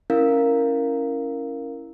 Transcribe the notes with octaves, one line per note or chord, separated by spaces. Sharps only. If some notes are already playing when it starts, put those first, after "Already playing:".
C#4 E4 A#4 F5